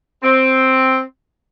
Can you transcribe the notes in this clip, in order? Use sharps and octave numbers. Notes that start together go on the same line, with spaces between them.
C4